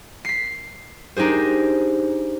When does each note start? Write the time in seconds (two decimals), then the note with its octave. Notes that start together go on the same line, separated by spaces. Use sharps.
0.25 B6 C7
1.17 D4 D#4 G4 G#4 C5